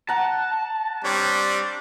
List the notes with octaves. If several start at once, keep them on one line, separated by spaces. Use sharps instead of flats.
F#5 A5 A#5
G3 C4 D4 C#5